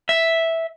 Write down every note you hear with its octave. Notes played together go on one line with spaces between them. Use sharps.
E5